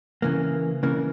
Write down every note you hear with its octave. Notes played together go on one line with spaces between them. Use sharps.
C#3 E3 A#3
C#3 E3 A#3